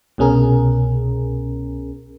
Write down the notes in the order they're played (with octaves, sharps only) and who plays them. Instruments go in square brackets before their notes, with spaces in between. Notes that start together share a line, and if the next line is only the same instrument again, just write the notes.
[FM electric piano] C2 B2 C#4 G#4 A#4